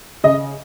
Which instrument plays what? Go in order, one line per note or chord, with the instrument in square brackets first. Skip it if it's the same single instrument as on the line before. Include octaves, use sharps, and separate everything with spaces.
[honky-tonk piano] C#3 D#5